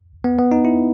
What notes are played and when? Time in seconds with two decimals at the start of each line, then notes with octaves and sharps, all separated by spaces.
0.24 B3
0.39 B3
0.52 D#4
0.65 E4